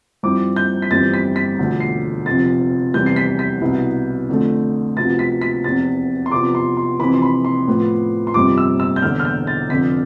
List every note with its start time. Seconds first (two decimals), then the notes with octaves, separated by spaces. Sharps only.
0.23 G2 F3 C4 E4 D6
0.56 G6
0.82 B6
0.91 G1 F2 E3 G3 C4 A6
1.14 B6
1.36 B6
1.58 E1 D2 D3 F3
1.80 C7
2.26 F1 F2 C3 F3 A6
2.94 F1 E2 C3 E3 G3 G6
3.06 C7
3.16 B6
3.39 B6
3.61 C2 B2 B3 E4
4.29 F2 D3 A3
4.97 D2 C3 F3 B3 A6
5.19 B6
5.41 B6
5.64 F1 E2 C3 A6
6.26 C6
6.31 E2 C3 F3 B3 D6
6.55 C6
6.77 C6
6.99 F1 F2 C3 E3 B5
7.14 C6
7.22 B5
7.45 C6
7.68 A2 F3 B3
8.27 C6
8.34 G1 F2 C3 G3 C4 D6
8.58 E6
8.80 E6
8.96 G6
9.02 E1 E2 D3 F6
9.20 F6
9.25 G6
9.47 A6
9.70 F1 F2 D3 B6